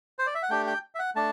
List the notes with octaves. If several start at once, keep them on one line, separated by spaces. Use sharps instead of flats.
C5
D5
E5
F#5
A3 D4 G4 G5
G5
E5
F#5
A3 D4 A5